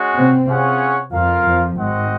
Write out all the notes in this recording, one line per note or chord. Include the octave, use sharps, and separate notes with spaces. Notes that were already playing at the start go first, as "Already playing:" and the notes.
Already playing: G#3 C#4 F#4
C3 C4
C#4 F4 G#4 C#5 F#5
F2 F3 F4 A#4 F5
F2 F3
G#1 G#2 C4 F#4 C5 D#5 F#5